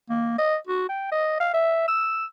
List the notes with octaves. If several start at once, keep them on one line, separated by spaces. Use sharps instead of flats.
A#3
D#5
F#4
G5
D#5
F5
E5
E6